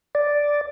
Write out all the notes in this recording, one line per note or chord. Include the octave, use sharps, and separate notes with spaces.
D5